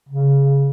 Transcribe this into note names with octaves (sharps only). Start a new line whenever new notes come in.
C#3